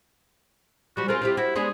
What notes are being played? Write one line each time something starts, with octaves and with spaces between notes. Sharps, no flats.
F3 G3 F#4
C4 F4 G#4 A#4
C4 E4 G4
E4 F#4
G#3 B3 D4 G#4